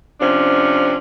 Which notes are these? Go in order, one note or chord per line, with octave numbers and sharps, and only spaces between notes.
C3 F3 C#4 D4